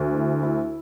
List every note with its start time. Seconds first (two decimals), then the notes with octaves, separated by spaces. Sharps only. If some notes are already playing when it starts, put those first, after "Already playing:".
Already playing: D2
0.14 E4
0.43 E4